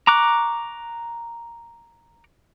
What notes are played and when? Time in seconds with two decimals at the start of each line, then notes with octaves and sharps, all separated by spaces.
0.07 A#5 C#6 D6 F#6